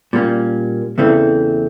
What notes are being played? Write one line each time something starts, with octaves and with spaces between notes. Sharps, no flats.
A#2 G3 A#3 C#4
E2 C#3 E3 A3 C4